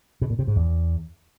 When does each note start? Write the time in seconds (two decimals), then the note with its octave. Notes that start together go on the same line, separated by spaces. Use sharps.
0.21 B2
0.30 A#2
0.39 C3
0.47 G#2
0.56 E2